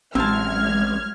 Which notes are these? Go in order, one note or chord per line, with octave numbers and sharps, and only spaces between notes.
A1 A2 F#3 G#3 C4 A5 F6 G#6